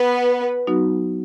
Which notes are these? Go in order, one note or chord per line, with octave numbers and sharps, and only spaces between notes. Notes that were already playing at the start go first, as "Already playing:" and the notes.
Already playing: B3 B4
F#3 B3 D#4 F#4